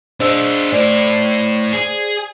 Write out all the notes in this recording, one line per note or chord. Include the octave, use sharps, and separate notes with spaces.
D4 G#4 C5 D#5 E6
A2 C5 D5
G#4